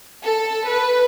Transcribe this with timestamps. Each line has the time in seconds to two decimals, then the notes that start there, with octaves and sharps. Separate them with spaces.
0.24 A4
0.66 B4